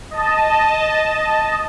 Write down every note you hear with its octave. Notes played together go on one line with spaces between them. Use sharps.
D#5 A5